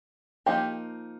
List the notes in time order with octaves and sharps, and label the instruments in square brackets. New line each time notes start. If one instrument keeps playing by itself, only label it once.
[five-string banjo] F3 A#3 D#4 G4